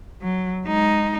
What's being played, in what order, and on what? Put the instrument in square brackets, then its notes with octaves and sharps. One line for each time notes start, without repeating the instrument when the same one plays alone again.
[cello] F#3
G#3 D#4